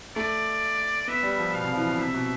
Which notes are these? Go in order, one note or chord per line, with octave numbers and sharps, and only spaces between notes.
A3 D5
B3 E5
G3
F3
B2 F5
C3
F3
E3
B2
C3 E5
B2